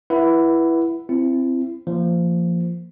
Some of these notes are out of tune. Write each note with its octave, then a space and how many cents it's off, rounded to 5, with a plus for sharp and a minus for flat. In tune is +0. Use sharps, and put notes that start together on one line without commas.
E4 +10 B4 -20 F#5 +0
C4 +0 E4 +30
F3 -20 A#3 -20